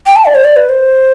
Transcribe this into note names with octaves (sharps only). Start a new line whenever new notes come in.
G5
A5
D5
C5
D5
B4
C5